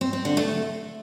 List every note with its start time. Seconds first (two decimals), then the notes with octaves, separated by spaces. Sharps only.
0.01 C4
0.13 C4
0.25 D3
0.37 A3